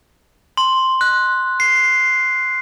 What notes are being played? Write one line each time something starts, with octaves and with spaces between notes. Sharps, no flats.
C6
F#6
C7